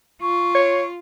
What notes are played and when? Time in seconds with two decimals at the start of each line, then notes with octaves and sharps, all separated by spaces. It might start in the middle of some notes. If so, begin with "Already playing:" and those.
0.22 F4 C#6
0.55 C#5